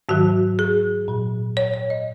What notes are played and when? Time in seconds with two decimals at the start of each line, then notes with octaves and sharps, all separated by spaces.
0.09 G#2 D#3 F#3 F#4
0.59 G#4
1.08 A#2 F#3
1.57 C#5
1.74 C#5
1.90 D#5